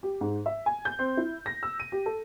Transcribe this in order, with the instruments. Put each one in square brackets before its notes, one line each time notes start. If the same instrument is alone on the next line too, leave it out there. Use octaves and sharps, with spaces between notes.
[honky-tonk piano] G4
G#2
E5
G#5
G6
C4
E4
A#6
E6
D#7
G4
A4